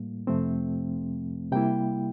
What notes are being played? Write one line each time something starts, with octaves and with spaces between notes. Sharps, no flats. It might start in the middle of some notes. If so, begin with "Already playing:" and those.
Already playing: A2 G3 A#3
F2 C3 F3 A3 C4
C3 G3 A#3 E4 G5